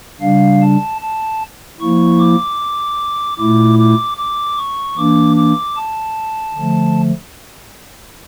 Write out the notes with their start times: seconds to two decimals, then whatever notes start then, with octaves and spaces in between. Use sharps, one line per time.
0.21 C#3 G3 D4 F5
0.61 A5
1.01 A5
1.80 F3 A#3 E4 C#6
2.19 D6
3.38 A#2 A3 E4 D6
3.79 D6
4.17 D6
4.58 C#6
4.97 E3 A#3 D4 D6
5.37 D6
5.76 A5
6.56 D3 F3 A3